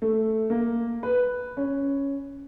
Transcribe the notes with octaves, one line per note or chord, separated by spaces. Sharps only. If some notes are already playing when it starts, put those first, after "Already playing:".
A3
A#3
B4
C#4